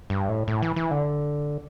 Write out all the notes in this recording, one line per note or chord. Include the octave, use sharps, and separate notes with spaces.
G2
A2
A2
E3
E3
D3